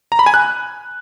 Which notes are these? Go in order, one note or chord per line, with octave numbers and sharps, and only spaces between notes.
A#5
B5
G#5
F#6